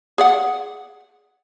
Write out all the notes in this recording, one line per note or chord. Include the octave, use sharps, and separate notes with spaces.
G#4 D5 F#5